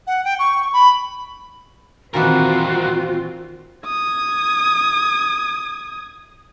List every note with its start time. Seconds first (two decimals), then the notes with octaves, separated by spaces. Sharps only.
0.07 F#5
0.25 G5
0.39 C#6
0.73 B5
2.14 A#2 D#3 E3 G3 C4 F4 F#4 A#4
3.85 D#6 G#6